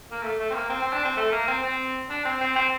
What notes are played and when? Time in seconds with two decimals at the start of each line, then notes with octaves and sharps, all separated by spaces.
0.11 A#3
0.23 A3
0.39 A3
0.50 C4
0.54 A#3
0.69 C4
0.81 C4
0.93 D4
1.05 C4
1.17 A3
1.32 A#3
1.48 C4
1.63 C4
2.10 D4
2.25 C4
2.41 C4
2.56 C4